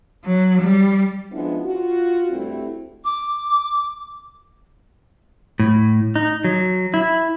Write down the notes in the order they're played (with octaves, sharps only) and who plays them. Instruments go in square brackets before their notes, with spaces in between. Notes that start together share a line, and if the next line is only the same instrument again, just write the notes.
[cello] F#3
G3
[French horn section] F3 G#3 B3 C#4 D4 E4
F4 F#4
G2 G3 A3 C4 E4 F#4
[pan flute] D6
[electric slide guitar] A2
D#4
F#3
E4